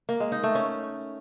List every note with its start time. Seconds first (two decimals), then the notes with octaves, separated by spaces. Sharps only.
0.09 A#3
0.20 G#3
0.32 D#4
0.43 A3
0.55 C#4